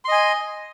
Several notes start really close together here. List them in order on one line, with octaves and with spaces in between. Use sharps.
C6 D#5 G#5